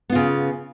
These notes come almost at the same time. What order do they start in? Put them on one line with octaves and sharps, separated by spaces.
B3 F4 C#3